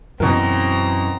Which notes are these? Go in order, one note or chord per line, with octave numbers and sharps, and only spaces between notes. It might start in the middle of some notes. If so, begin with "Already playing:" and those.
F#2 B2 E3 C4 C#4 A#4 A#5